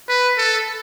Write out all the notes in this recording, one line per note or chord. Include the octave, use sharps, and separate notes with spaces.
B4
A4